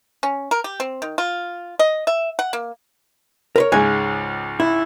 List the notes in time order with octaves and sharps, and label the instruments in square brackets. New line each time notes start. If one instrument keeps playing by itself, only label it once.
[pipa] C#4
A#4
G4
C4
D#3
F4
D#5
E5
F#5
A#3
[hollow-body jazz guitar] A#4 B4 C#5
[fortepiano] C#2 G#2 C#3 [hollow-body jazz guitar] G#5
[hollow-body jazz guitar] E4